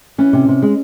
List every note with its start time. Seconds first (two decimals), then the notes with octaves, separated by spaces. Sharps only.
0.18 E3 C#4
0.33 C3
0.48 C3
0.62 G#3